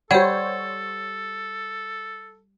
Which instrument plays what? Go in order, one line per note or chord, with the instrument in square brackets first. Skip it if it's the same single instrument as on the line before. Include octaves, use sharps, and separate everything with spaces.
[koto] G3 [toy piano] G4 F#5 [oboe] A4 [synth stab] C5 C#5